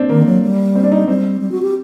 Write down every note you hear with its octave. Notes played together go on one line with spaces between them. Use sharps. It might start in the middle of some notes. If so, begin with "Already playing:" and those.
Already playing: C4 D4
D#3 A#3
F#3
G3
C4
D4
D#4
G3 C4
G3
F#4
G4